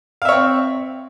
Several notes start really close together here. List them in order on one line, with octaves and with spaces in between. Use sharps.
F5 E5 C#5 C4